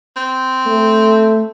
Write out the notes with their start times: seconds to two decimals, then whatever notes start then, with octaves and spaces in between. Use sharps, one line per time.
0.16 C4
0.66 A3